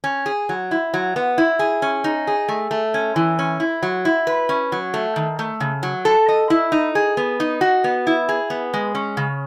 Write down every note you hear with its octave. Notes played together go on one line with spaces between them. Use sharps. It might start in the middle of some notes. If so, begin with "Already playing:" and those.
C#4
G#4
F#3
E4
F#3
B3
E4
G#4
C#4
D#4
G#4
A3
A3
C#4
E3
C#4
E4
F#3
E4
B4
C#4
F#3
A3
D#3
A3
C#3
F#3
A4
D#5
E4
D#4
G#4
B3
D#4
F#4
B3
E4
G#4
B3
G#3
C#4
C#3